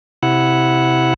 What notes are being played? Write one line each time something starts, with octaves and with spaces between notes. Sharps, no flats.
C3 E4 F#5